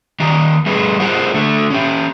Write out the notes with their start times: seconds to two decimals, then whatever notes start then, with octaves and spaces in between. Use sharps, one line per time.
0.20 D#3 G4 D5 A#5
0.66 G3 A3 G#4 B4
1.00 F4 G4 G#4 A#4 C5 F#5
1.34 D3 A3
1.70 C#4 G4